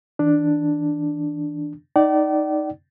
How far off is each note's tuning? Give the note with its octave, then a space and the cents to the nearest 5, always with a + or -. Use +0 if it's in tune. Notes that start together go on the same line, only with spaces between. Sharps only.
E3 -35 D4 +5
D#4 +0 D5 +0 G5 -45